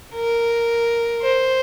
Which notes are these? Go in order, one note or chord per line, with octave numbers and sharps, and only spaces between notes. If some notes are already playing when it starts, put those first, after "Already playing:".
A#4
C5